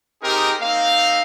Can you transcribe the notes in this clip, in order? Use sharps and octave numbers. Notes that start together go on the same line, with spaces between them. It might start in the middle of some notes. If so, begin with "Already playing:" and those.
C4 D#4 G4 G#4 A#4
A#3 C4 D#4 F5